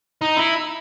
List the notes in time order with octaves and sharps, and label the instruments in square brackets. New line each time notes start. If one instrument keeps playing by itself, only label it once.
[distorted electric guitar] D#4
E4